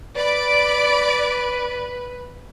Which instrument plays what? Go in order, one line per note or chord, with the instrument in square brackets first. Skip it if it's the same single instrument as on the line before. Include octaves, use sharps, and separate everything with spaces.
[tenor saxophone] B4 [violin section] D5 B5 D7